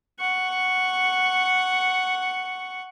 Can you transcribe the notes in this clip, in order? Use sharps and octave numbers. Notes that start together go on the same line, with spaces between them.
F#5 C#6